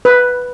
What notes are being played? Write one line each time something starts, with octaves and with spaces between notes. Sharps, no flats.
B4